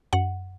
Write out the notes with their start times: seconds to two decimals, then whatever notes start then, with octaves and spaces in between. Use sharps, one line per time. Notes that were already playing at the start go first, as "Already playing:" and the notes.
0.13 F#2 F#5